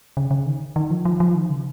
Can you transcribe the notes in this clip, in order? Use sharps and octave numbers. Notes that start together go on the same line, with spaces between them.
C#3
C#3
D#3
D#3
F3
F3
F3
D#3
C#3